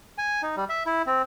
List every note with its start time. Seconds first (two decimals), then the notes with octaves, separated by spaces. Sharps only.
0.18 G#5
0.42 D#4
0.56 G3
0.69 E5
0.86 E4
1.06 C4